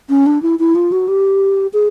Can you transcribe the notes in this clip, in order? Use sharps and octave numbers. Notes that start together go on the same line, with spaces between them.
C#4
D4
E4
E4
F4
F#4
G4
G#4